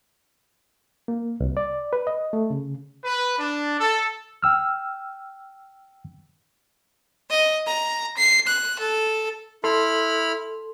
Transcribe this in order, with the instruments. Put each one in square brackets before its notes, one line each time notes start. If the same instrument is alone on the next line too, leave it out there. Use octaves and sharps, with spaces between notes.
[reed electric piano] A#3
C2
D5
B4
D#5
A3
C#3
[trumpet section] B4
D4
A4
[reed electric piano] G5 E6 F6
[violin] D#5
A#5
C7
F#6
A4
[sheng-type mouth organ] E4 B5 F6 [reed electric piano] A4 C6